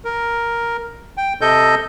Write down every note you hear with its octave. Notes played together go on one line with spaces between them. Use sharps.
A#4
G5
C3 A4 D#5 G6